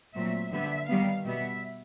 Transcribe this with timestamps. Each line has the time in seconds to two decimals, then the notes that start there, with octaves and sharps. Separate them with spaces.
0.15 A#2 F#3 A3 C4 E5
0.52 D3 G3 B3 E5
0.89 D#3 G3 B3 F5
1.26 B2 G3 B3 E5